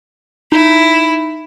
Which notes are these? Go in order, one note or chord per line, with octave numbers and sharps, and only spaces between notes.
D#4 E4 B5